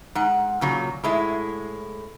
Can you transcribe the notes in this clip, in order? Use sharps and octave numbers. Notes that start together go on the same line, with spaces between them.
G#2 F#5
A#2 C#3 F#3
A2 G#3 E4